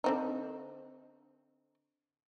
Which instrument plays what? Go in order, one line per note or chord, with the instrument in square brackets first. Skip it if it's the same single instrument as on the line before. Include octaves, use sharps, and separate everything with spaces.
[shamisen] D3 C4 D#4